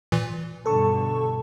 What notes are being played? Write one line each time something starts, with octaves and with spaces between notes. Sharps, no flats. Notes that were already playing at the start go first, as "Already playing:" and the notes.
A#2 E3
G2 B2 D3 A4 A5 C#6